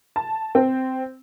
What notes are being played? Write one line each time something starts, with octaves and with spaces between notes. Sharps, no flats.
A5
C4